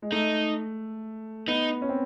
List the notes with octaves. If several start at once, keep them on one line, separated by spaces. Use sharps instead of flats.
G#3
A3 D#4
B3 D#4
C#4
C4